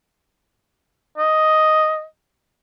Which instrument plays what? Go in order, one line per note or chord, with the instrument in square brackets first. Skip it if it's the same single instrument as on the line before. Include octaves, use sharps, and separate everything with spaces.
[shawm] D#5